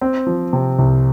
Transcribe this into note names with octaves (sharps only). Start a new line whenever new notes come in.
C4
F3
C3
C2